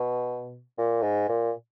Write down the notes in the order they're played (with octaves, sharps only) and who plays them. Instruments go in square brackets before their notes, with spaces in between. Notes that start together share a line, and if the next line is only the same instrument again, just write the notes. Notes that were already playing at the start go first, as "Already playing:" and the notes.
Already playing: [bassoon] B2
A#2
G#2
A#2